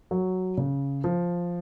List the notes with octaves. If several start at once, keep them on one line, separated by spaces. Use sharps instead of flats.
F#3
C#3
F3